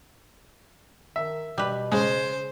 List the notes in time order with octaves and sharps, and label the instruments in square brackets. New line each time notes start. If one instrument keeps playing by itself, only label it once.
[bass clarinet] D#3 [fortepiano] E5
[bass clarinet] B2 [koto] G3 B4
[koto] C#3 [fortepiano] G#3 [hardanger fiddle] C5